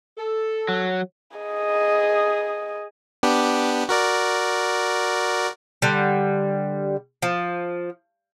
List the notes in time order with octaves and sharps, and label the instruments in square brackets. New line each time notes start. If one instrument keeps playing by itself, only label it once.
[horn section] A4
[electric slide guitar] F#3
[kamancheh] G#4 D#5
[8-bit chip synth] B3 D4 G4
F#4 A#4 D5
[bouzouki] D3 G3
F3